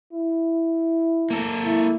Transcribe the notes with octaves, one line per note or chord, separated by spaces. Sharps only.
E4
A#3 A4
E4